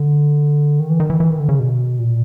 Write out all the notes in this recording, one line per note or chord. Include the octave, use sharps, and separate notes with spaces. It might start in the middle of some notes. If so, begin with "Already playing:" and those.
Already playing: D3
D#3
E3
D#3
E3
E3
D#3
D3
C#3
B2
A#2